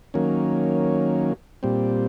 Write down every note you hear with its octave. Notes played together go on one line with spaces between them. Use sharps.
D#3 F#3 A#3 C#4
A#2 G3 C4